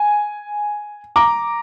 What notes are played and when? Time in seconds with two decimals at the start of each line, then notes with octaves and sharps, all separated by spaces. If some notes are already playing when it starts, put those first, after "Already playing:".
Already playing: G#5
1.16 A#5 D6